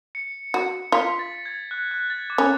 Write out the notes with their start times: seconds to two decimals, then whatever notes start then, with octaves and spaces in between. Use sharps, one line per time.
0.15 C#7
0.54 F#4
0.92 F4 B6
1.19 A6
1.35 A6
1.46 G#6
1.71 F#6
1.91 F#6
2.10 A6
2.30 D6
2.38 C#4